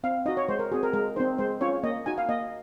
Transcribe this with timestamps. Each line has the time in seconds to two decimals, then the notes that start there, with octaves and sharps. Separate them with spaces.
0.04 C4 F5
0.26 D#4 F#4 D#5
0.37 C#5
0.49 G#3 C5
0.59 A#4
0.72 C4 F#4 G#4
0.83 A#4
0.93 G#3 A#4
1.16 C4 D#4 C5
1.38 G#3 C5
1.61 C#4 F4 C#5
1.83 A#3 D#5
2.06 D#4 F#4 G#5
2.18 F5
2.29 A#3 D#5